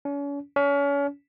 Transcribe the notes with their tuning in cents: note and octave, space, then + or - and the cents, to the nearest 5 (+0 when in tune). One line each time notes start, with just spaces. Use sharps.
C#4 +40
C#4 +35